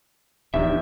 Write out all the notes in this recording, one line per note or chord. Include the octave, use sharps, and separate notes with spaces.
D1 E2 F3 D4 D#4 G4 E5